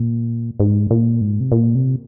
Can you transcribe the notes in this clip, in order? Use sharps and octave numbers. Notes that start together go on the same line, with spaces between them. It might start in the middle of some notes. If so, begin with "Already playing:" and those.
Already playing: A#2
G#2
A#2
G#2
C3
A#2
C3